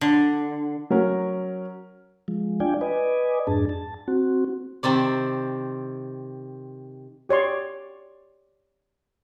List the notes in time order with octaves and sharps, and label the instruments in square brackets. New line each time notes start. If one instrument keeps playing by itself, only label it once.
[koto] D3
[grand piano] F#3 C#4 A#4
[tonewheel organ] F3 G#3
D4 F4 D5 G5 G#5
B4 D5 D#5 G#5
F2 G#2 D4 G#4 A5
A5
C4 F#4
[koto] C3 D#3 C4 D5
[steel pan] G4 C#5 D5 C6